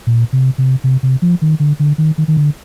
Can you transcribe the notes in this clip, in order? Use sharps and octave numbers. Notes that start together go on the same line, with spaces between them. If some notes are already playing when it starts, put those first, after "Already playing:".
A#2
C3
C3
C3
C3
F3
D#3
D3
D3
D#3
D#3
D#3
D3